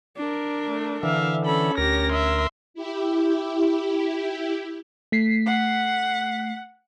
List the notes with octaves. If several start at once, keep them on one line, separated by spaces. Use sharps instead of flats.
D4 A#4
A3
D3 E3 E5 F5
C#4 A4 B5
D2 G4 A#4 A#6
E5 C6
E4 G4
A3 B6 C7
F#5